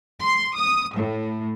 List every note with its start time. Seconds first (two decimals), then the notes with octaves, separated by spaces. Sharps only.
0.21 C6
0.55 D#6
0.97 A2